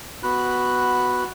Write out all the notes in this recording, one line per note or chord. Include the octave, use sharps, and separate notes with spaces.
B3 F#4 B5 F#6